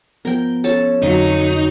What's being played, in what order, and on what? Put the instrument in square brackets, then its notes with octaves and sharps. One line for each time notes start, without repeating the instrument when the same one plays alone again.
[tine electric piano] F3 B3 [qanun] A#4 G5
[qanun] C#4 A4 A5
[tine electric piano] F2 D3 [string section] F#3 [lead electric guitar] D#4